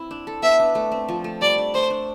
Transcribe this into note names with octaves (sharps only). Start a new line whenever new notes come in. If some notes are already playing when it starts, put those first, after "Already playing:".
Already playing: C4 E4
D4
A4
B3 E5
D4
A3
C4
F3
A3
G3 D5
D4
A3 C5
D4